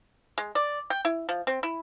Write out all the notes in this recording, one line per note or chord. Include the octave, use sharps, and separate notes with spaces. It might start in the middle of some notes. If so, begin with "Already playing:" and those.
G#3
D5
G5
E4
F3
C4
E4